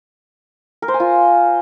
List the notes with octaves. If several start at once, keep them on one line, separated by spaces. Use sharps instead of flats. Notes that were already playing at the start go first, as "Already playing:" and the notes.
A#4
C5
G#5
F4